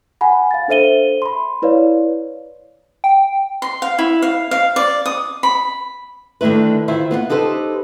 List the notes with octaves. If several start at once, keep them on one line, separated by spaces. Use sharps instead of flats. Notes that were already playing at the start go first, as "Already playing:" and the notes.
F#5 G#5 B5
F5 A6
D4 A4 C5 E5 D#7 G7
B5 C6
E4 B4 C#5 D5 F5
G5
C6
F5
E4
F5
F5
D5
D#6
B5
D3 D#3 A3 E4 B4
D#3 E4 F4 C5
B3 F4 D5 F#5
D#4 G4 A4 B4 C5